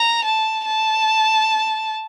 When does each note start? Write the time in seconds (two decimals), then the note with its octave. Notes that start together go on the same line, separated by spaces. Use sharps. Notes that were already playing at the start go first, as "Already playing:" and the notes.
Already playing: A#5
0.25 A5
0.65 A5